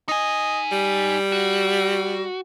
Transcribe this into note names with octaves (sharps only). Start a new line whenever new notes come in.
D#4 D#5 G#5
G3
F#4